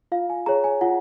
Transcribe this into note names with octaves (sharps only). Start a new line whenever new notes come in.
F4 F5
G#5
G#4 C#5 A#5
G#5
F4 F#5